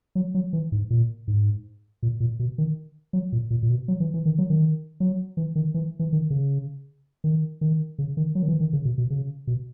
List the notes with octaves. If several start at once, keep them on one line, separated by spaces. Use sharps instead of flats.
F#3
F#3
E3
G#2
A#2
G#2
A#2
A#2
B2
D#3
F#3
A#2
A#2
A#2
B2
F#3
E3
E3
D#3
F#3
D#3
F#3
E3
D#3
E3
E3
D#3
C#3
D#3
D#3
C#3
D#3
F#3
D#3
E3
D#3
C#3
B2
B2
C#3
B2